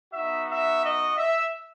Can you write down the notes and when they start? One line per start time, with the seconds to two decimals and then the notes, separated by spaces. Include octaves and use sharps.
0.14 B3 D#4 F#4 E5
0.49 E5
0.83 D#5
1.17 E5